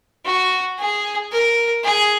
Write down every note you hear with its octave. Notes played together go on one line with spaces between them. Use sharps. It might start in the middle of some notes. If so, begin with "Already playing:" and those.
F#4
G#4
A#4
G#4